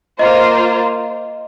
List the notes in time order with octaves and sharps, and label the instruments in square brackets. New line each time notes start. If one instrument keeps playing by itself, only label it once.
[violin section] A#3 F4 C5 [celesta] D#5